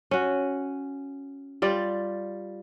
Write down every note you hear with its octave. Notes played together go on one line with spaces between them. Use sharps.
C#4 F#4
G3 F4 D5